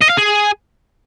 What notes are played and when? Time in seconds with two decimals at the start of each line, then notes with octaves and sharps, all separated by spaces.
0.02 D#5
0.10 F5
0.17 G#4